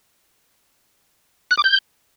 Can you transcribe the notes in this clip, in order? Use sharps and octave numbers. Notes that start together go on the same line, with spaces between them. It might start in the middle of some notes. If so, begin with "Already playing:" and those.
F#6
D6
G6